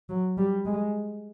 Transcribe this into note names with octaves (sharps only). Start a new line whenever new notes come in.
F#3
G3
G#3